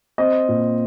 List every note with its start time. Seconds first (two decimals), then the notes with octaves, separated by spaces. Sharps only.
0.18 C4 D#5
0.49 A#2